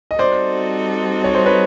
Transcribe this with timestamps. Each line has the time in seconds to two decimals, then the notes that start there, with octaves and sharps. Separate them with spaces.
0.11 D#5
0.19 G3 C4 D#4 F#4 A4 C5 D5
1.24 C#5
1.35 C5
1.46 B4 C#5